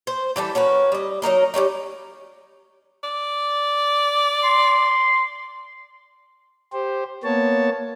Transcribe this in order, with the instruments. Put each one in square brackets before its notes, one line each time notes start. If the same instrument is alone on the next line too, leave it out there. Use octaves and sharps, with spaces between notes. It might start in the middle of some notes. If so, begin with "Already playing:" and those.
[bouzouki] C5
E3 G3 G4 A4
C#4 F#4 A#4 B4
G3 D#5
F#3 D#4 A#4 D#5
G3 G#3 C#4 D#4
[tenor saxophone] D5
[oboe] C6
[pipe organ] G4 C5
A#3 B3 C#5 A5